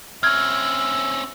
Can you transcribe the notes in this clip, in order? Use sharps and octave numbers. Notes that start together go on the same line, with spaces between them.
C4 C#4 E5 F6 G#6